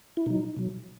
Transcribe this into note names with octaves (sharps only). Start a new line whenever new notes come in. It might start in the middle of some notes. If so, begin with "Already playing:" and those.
E4
B2 F#3 D#4
B2 F#3